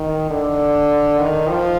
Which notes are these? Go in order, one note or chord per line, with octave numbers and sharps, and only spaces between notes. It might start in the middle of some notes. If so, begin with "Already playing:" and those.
Already playing: D#3
D3
D#3
F3